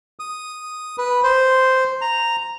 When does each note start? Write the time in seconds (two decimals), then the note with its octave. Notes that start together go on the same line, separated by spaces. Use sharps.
0.20 D#6
0.98 B4
1.23 C5
2.02 A#5